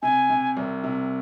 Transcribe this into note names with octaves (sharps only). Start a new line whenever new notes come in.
C3 G#5
C3
C2
C3